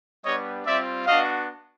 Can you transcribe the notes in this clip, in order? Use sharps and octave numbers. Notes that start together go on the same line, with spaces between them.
G3 B3 D4 G4 C#5 D#5
G3 C4 F4 D5 E5
B3 D4 F#4 D#5 F5